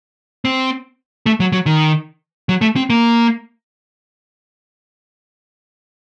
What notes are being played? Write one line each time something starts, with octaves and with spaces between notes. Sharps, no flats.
C4
A3
F#3
F#3
D#3
F#3
A3
C4
A#3